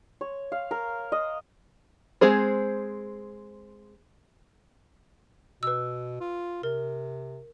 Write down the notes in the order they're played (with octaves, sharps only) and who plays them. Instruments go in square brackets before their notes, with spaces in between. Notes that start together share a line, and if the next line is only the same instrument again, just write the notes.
[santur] C#5
F5
A#4
D#5
[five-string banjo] G#3 C4 G#4 C5
[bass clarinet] B2 [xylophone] B4 E6
[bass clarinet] F4
[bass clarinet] C3 [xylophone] A#4